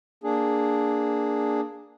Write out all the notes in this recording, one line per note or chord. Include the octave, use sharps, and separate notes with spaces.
A#3 D4 G#4